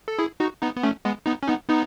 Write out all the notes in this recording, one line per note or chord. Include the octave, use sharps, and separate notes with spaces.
A4
E4 G#4
D#4 F#4
B3 D#4
B3
A3 C#4
G#3 B3
B3 D#4
C#4
B3 D#4
B3 D#4